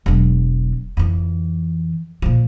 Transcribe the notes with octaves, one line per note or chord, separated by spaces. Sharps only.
E1 F#3
F2 E3
A#2 F3